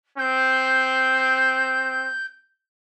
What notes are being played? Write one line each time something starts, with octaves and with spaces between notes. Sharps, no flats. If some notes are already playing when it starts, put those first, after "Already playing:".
C4 G6